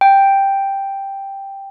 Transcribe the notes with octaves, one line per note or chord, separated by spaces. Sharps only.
G5